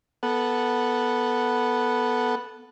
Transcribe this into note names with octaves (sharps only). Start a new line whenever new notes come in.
B3 A4 F#5